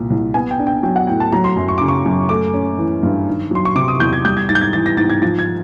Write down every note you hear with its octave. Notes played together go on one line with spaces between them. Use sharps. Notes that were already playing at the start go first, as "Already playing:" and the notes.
Already playing: C2 A#2
C2
B3 G#5
G5
D4
G5
F#3 G5
F#5
A2 G5
A5
F#3 A#5
C6
F#2
C#6
C#3 D6
C#6
F#2
A3 D6
C#4
E3
G2
D#3
F#3 C6
C#6
C3 D6
D#6
E2 G6
G#6
G3 G6
G#6
G#2 A6
G6
G#6
E3 A6
A#6
G#2 A6
G#6
F3 A6
G#6